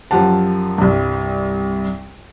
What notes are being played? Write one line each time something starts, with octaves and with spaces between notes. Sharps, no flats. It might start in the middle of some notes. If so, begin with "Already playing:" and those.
F#2 F3 G4 F#5 A5
C2 G2